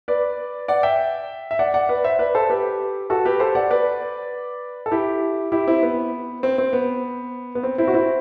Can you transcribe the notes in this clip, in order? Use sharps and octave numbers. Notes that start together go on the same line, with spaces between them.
B4 D5
D5 F#5
E5 G5
E5
D5 F#5
D5 F#5
B4 D5
C5 E5
B4 D5
A4 C5
G4 B4
F#4 A4
G4 B4
A4 C5
D5 F#5
B4 D5
A4
E4 G4
E4 G4
C4 E4
B3
C4
C4
B3
B3
C4
C4 E4
F#4
C4 E4